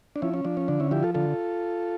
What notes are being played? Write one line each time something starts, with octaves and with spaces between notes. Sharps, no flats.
D4
F3 C#4 E4
C#4
F3 D4
C#4
D3 D4
C#4 E4
F3 E4 G4
F4 A4
D3 F4 A4